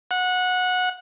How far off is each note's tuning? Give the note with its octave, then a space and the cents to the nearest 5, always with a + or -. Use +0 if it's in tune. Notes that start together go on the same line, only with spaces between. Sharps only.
F#5 -20